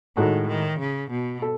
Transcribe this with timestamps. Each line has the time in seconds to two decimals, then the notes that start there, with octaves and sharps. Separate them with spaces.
0.17 A2 D#3 G#3 D#4 F#4 A4
0.48 D#3
0.80 C#3
1.11 B2
1.42 A4